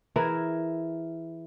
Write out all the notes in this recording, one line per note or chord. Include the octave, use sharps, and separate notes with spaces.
E3 E4 G#4 A#4